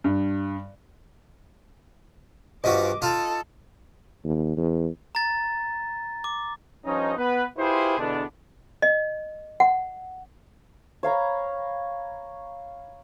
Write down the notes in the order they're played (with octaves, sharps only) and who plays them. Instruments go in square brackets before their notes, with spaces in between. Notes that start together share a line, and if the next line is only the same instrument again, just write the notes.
[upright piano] G2
[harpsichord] G2 F3 F#4 [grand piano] D#5 [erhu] D6
[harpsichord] D#4 F4 [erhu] A4
[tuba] D#2
E2
[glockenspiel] A#5 A6
D6
[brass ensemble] G2 F3 C#4 D#4
B3 B4
E4 F4 G4 G#4 B4 C5
E2 B2 D3 B3 D4
[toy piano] D#5
F#5
[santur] C#5 F5 A#5 B5